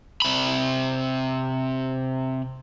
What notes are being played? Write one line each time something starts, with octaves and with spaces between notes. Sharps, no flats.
C3 B5